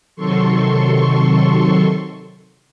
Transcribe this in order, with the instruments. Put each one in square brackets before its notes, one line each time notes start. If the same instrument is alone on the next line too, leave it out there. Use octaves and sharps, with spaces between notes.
[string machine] C3 D#3 F#3 A4 C6 C#6